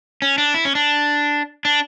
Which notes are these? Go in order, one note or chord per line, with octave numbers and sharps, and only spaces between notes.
C#4
D4
E4
C#4
D4
D4